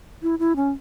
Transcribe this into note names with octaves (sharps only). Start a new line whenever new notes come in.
E4
E4
C#4